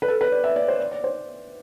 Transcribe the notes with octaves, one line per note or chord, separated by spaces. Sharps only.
B4
A4
B4
D5
E5
D5
C5
D5
D5
C5